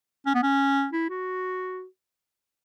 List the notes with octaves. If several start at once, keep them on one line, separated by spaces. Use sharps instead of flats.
C#4
B3
C#4
E4
F#4